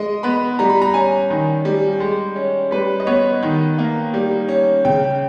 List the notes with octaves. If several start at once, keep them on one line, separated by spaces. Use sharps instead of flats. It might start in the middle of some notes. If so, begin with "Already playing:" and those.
Already playing: G#3 D#5
B3 B5
G3 A#5
B5
A#5
C#4 G#5
D#3
G3
G#3
C#4
G3 B4
D#5
B3 C#5
D#3
A#3
G3
C#4
C#3 G5